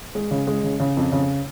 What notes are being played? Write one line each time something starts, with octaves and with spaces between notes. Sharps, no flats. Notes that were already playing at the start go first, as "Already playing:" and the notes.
G#3
C#3
G#3
C#3
C#3
F2
C#3